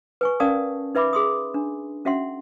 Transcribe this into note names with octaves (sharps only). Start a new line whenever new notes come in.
B4 G#5 C#6
C#4 A#4 D5 F5 A5 D#6
D#4 B4 E5 B5 D6
G#4 C6 D#6
D4
C#4 F#4 E5 F#5 C6